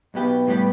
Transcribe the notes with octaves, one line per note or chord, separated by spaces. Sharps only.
B1 B2 B3 G4
A2 G3 B3 G4